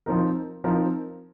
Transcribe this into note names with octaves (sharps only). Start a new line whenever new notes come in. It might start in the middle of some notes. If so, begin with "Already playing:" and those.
F3 C4 D#4 A#4
F3 C4 D#4 A#4